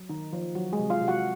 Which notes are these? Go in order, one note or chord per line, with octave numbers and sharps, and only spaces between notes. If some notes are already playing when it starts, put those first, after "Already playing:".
Already playing: F#3
D#3 A#3 D#4
F3 A#3 F4
D#3 F#3 F#4
G#3 G#4
C3
F4 F5
C3
F#4 F#5